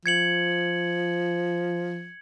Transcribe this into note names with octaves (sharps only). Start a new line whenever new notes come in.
F3 G#6 C#7 F#7